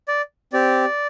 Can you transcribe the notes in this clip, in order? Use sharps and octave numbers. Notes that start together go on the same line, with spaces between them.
D5
C4 G4 D5